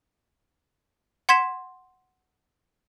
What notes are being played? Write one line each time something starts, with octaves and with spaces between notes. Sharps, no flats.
F#5 C6 G#6 B6 E7